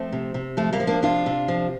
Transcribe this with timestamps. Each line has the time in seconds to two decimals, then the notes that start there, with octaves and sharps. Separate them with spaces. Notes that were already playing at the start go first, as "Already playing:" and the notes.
Already playing: F3 A3 C4
0.12 C3
0.34 C3
0.57 F3 A3
0.73 G3 A#3
0.80 F3
0.87 A#3 D4
1.02 C3 D4 F4
1.26 C3
1.48 F3